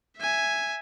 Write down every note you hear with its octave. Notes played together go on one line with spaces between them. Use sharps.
E5 G#5